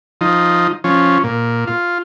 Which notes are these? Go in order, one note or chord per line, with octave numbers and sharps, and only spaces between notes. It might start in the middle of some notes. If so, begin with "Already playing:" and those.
F3 D#4
F3 C#4
A#2
F4